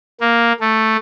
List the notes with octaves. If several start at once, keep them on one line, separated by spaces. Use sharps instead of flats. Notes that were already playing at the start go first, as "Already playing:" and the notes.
A#3
A3